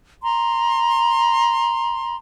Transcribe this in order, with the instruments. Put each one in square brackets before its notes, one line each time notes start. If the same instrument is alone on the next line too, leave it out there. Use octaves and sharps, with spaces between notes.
[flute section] A#5 C6